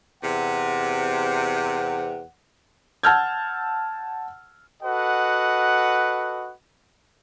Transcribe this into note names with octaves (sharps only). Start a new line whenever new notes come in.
E2 C3 F#5
F#5 A5 E6 F6 G6 G#6
F#4 A4 B4 D#5 F#5